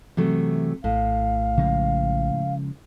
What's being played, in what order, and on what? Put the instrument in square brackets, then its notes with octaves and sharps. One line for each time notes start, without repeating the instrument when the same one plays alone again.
[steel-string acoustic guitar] C3 F#3 A3 [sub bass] E3
[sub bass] A#1 [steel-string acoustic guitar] A2 [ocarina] F5
[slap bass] C#3 F3 G#3